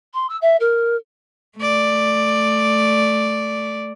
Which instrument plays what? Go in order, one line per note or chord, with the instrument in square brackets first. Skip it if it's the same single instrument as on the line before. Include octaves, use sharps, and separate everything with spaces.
[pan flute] C6
E6
E5
A#4
[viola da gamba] A3 D5